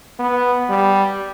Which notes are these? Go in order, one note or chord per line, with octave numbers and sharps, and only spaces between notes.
B3
G3